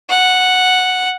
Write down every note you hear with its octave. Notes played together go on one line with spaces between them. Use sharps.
F#5